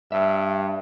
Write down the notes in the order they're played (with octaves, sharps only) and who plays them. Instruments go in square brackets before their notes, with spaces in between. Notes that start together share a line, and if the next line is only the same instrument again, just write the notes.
[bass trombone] G2 [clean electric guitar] E5